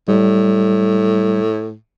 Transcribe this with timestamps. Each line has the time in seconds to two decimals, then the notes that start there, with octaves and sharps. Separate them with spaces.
0.08 A2 G3